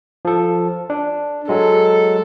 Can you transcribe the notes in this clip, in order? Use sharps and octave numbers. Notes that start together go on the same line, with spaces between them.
F3 A4
D4
F#3 G#3 A4